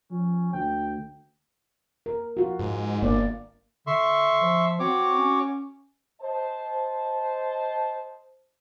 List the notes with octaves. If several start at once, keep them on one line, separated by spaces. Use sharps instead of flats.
F3 C#4
D2 G5
A#4
F4 F#4
G#2
G1 A#3 D5
D3 E5 C6 C#6
F3
C4 F#4 C#5 D6
C#4
C5 D#5 A5